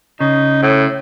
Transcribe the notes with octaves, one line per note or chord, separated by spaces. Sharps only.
C#3 D#4
A2